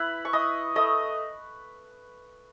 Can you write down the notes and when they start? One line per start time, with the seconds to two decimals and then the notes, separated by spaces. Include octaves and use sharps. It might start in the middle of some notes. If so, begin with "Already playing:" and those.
Already playing: E4 B4 B5
0.25 C#6
0.33 E4 D#5 D#6
0.75 A3 D#5 D#6